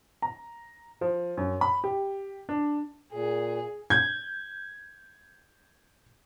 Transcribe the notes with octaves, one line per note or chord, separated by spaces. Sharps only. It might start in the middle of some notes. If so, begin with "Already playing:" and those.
A#5
F3
F#2
B5
G4
D4
A#2 G#4
G6 G#6